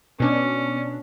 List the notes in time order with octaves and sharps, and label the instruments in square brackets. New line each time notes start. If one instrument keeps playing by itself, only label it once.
[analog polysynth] B2 D4 [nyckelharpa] C#4